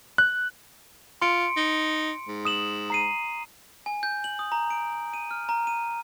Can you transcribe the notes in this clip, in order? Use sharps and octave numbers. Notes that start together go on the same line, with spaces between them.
F#6
F4 C6 C#7 D7
D#4
G#2
D#6 E7 F#7
A#5 C7 D#7
G#5
G6
F#7
D#6
A#5
D7
D#7
F6
A#5
D#7